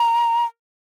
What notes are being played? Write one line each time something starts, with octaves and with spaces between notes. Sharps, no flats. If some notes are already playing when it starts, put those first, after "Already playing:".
Already playing: A#5